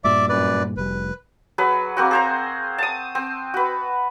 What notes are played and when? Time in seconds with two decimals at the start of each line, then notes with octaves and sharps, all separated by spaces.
0.04 G2 A#2 G3 D5 E5 D6
0.29 F#2 B4 D5
0.77 F1 G3 B4
1.58 F#3 G#4 B4
1.97 A#3 C4 F#4
2.11 G#4 C5 A#5
2.78 A5 D#6
3.15 C4
3.54 F#4 B4